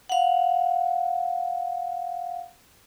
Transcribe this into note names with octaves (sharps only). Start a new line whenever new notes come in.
F5 F#5